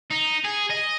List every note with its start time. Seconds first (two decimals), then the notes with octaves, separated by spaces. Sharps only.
0.11 D#4
0.45 G#4
0.70 D#5